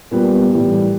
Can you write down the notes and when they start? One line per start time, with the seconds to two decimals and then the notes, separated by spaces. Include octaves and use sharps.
0.11 A#2 G3 B3
0.52 A2 E3 G3